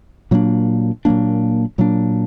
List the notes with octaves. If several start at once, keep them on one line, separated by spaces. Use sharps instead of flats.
A#2 F#3 A#3 D4
A#2 F#3 A#3 D4
A#2 F#3 A#3 D4